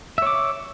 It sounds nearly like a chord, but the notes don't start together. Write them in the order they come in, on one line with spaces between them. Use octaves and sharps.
E5 C#5 D6